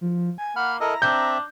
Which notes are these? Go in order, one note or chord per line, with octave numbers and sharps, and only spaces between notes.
F3
G#5
A#3 F#5 B5 F6
E4 A4 A#4 D#5 A#5
C4 D4 E5 G6